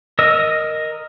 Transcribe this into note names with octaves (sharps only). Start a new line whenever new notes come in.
A#4 D#5 E6